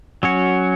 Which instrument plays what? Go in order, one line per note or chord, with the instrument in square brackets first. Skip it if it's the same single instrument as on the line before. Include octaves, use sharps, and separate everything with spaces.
[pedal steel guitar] F#3 C#4 F#4 C#5